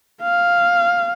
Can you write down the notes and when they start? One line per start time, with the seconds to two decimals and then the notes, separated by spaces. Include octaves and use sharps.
0.22 F5